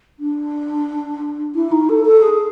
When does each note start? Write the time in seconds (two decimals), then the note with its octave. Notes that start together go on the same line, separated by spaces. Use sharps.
0.20 D4
1.55 E4
1.72 D#4
1.89 A4
2.05 A4
2.22 G#4